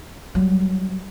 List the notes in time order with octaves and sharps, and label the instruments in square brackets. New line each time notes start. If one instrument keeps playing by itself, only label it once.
[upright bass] F#3 G3